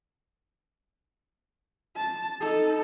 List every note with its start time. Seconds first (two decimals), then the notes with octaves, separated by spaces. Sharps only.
1.97 A5
2.41 D#4 A4